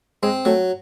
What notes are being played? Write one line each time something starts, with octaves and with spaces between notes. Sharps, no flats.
G#3 C4
F#3 A3